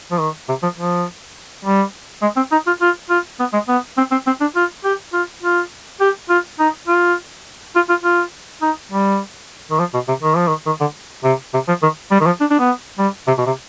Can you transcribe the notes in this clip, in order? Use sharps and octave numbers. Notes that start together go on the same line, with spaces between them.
F3
D#3
C3
F3
F3
G3
G#3
C4
D#4
F4
F4
F4
B3
G#3
B3
C4
C4
C4
D4
F4
G4
F4
F4
G4
F4
D#4
F4
F4
F4
F4
D#4
G3
D#3
F3
B2
C3
D#3
F3
D#3
D#3
D3
C3
C3
F3
D#3
G3
D#3
F3
D4
D4
B3
G3
C3
B2
C3